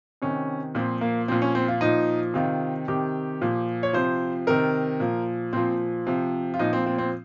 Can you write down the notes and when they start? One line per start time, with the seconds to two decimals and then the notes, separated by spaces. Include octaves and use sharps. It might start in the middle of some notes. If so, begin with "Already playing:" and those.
0.22 C3 D#3 C#4
0.75 A#2 F3 C4
1.01 A#3
1.28 A#2 F3 C4
1.42 C#4
1.55 C4
1.68 F4
1.81 A#2 F3 D#4
2.34 C3 D#3 F4
2.88 C3 D#3 G4
3.41 A#2 F3
3.83 C#5
3.93 C3 F3 C5
4.47 C3 D#3 A#4
5.00 A#2 F3
5.53 A#2 F3 C4
6.07 C3 F3
6.54 F4
6.59 A#2 F3 D#4
6.73 C4
6.86 C4
6.98 C4